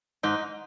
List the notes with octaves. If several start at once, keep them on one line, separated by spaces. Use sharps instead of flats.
G#2 D#4